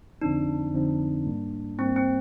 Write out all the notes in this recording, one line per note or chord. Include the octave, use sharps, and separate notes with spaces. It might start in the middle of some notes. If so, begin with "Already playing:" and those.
F2 D3 F3 C4 D4 D#4
F2 D3 F3 C4 D#4
G#2 G3 A#3
G#2 G3 A#3 C4
C4